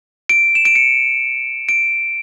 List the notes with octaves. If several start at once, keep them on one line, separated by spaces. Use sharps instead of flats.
D7
E7
D7
C#7
D7